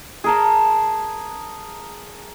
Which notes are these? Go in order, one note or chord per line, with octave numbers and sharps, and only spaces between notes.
G#4 A#4 A5